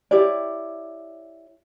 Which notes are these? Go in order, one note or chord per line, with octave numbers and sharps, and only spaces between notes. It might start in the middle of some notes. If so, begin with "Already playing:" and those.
E4 G4 C#5 D5